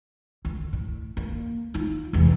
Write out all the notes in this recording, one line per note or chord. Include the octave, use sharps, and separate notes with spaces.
D2
A2
A#3
D#4 F4
F1 E2